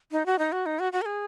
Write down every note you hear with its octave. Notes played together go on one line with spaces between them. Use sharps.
D#4
F#4
D#4
F#4
D#4
F#4
F#4
A#4
G#4